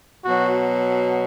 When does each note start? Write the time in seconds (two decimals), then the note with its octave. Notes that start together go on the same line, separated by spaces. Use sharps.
0.24 B2 F#3 F#4